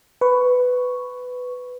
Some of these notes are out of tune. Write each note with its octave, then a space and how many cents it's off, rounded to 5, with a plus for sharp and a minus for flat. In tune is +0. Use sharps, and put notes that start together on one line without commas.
B4 +10 C#6 +0